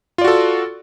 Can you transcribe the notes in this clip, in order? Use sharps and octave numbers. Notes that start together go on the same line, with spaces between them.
F4 F#4 A4 D5